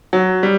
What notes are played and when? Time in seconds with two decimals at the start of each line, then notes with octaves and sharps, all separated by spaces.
0.13 F#3
0.43 G3